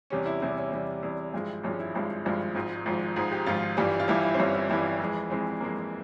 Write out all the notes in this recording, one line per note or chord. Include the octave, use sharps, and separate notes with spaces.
E2 C3 G3 C#4
E4
E2 C3 G3 E4
C#4
E2 C3 G3
E2 C3 G3 E4
G#1 G2 F3 G#3
G#1 G2 F3 G#3 C#4
E4
G#1 G2 F3 G#3
G#1 G2 F3 G#3
G#1 G#2 F3
G#1 G#2 F3
G#1 G#2 F3 G#4
G4
G#1 G#2 F3 F4
G1 G2 E3 G3
F4
G1 G2 E3 G3 E4
E4
C4
G1 G2 E3 G3 C#4
E4
G1 G2 E3 G3 E4
F2 E3 G#3
F2 E3 G#3 C4
F2 E3 G#3 A#3